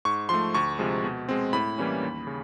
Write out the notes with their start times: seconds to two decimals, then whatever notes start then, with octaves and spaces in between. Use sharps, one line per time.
0.05 G#2 C#6
0.29 F3 A3 C6
0.54 D2 C#6
0.79 C3 F3 G#3
1.04 B2
1.29 G#3 C4
1.53 A2 B5
1.78 E3 G3 A#3 C#4
2.03 D#2
2.27 C#3